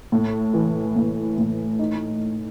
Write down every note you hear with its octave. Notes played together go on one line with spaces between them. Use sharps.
A2
E3
A2
A2
D#4